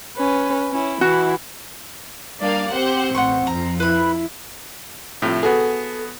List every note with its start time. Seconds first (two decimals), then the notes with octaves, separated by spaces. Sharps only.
0.17 C#4 B4
0.70 C#4 E4
1.01 E3 E4 F#4
2.40 G3 A#3 D4 D5 F5
2.71 C4 G4 C5 F#5
3.15 A1 F#5 C6 C#6
3.47 F2 F3 A#5
3.80 E4 B4 B5
5.22 A2 C3 F3
5.43 B3 F#4 G#4 A4